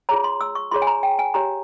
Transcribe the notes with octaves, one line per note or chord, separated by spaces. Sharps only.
F4 G#4 C#5 A#5
C6
E6
C#6
F4 G#4 C#5 C6
G#5
A#5
G5
G#5
G4 C#5 A#5